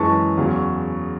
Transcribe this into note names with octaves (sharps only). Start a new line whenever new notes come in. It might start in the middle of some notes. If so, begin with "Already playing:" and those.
Already playing: F#2 E3 G#3 A5 C#6
E2 C#3 F#3